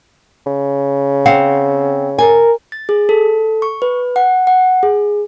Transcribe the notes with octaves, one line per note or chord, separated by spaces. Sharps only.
C#3
C4 F5 F#5
A#4 G#5
A6
G#4
A4
C#6
B4
F#5
F#5
G#4